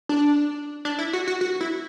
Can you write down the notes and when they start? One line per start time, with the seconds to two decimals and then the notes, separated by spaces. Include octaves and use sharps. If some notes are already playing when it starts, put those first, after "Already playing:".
0.09 D4
0.85 D4
0.99 E4
1.13 F#4
1.28 F#4
1.41 F#4
1.61 E4